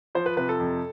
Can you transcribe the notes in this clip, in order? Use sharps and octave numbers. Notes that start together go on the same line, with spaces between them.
F3 C5
B4
C3 B4
A4
F2